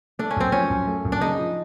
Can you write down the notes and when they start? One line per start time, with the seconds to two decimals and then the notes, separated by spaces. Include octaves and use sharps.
0.19 A3 D4
0.31 C#4
0.36 F#2 C4
0.52 F3 C#4
0.70 F#2
0.87 A3
1.05 F#2
1.12 D4
1.21 C#3 D#4
1.38 F3